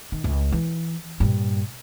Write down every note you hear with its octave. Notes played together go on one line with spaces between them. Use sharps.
D#3
C#2
E3
G2 A#2